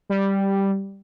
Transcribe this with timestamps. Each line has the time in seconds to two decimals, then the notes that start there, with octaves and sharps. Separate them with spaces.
0.10 G3